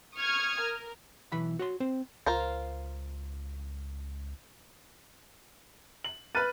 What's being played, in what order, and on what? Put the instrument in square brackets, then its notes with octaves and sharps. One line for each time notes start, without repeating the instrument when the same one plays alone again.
[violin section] C#6 D#6 F6 G#6
A#4
[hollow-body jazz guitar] B1 E3 B5
F#4 C#5 C6
C4 C5
[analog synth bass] C#2 [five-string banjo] F4 A#4 C5
[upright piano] F#7
[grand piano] B4 D#7 [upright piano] F6 F#6 A6